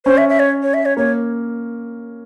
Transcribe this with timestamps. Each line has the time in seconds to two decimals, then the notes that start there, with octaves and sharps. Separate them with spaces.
0.06 C#4 C5
0.18 E5
0.29 E5
0.40 C#5
0.63 C#5
0.74 E5
0.85 C#5
0.97 A#3 C#5